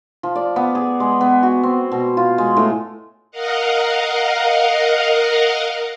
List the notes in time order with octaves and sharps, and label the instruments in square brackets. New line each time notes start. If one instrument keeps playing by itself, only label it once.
[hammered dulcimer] F3
D5
B3
G#4
G#3
B3
F#4
C4
B2
F4
G#3
A2
[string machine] A#4 D#5 F5 F#5